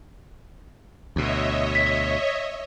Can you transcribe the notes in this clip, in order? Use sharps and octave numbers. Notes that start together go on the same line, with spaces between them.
D2 B2 C#5 D#5 E5
B6